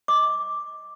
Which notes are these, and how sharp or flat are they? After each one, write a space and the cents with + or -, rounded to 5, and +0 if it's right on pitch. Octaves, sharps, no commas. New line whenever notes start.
D#5 +20 D6 +0